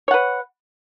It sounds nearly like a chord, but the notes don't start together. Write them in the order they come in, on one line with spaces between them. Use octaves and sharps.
C#5 F#5 B4